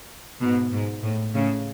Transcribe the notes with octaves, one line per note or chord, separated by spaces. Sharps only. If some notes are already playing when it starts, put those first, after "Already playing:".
G#2 B2
G#2
A2
A2 C#3